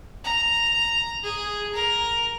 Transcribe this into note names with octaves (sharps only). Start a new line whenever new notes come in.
A#5
G#4
A#4